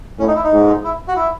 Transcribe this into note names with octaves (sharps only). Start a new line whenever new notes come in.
A2 C#4
D#4
E4
D#4
G#2
E4
F#4
E4